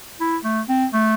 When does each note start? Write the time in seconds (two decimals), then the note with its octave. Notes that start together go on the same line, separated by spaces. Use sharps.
0.20 E4
0.44 A3
0.69 C4
0.93 A3